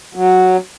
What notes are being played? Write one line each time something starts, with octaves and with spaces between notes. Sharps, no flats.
F#3